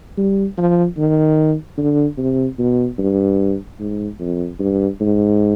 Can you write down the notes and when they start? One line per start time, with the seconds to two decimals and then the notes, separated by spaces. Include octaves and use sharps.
0.17 G3
0.58 F3
0.98 D#3
1.77 D3
2.18 C3
2.59 B2
2.99 G2
3.80 G#2
4.19 F2
4.59 G2
5.00 G#2